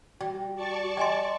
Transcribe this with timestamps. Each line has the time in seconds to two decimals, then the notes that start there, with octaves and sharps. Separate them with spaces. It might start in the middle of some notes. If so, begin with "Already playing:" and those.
0.21 G3 F#4 G5
0.56 F#4 D5 A5 C#6
0.97 D#5 G5 G#5 C6